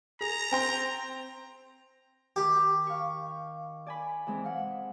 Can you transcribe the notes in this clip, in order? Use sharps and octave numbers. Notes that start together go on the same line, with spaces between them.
G#4 A#5
C4 G5 C6
D#3 G4
F5 C#6
D5 G#5 B5
E3 G#3 C4
F5 F#5